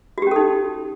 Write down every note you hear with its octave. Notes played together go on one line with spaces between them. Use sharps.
C#4 D#4 F#4 G4 A4